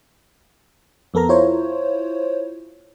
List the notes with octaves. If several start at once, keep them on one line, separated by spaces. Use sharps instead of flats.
F2 B3 A4 A#4 A#5
E4 F4 C5 C#5